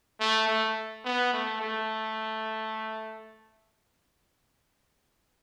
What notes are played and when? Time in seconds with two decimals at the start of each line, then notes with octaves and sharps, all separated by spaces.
0.20 A3
0.48 A3
1.04 B3
1.33 A3
1.61 A3